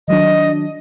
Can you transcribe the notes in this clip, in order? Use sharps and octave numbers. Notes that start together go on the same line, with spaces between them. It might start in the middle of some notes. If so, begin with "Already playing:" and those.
D#3 F#3 D4 D#5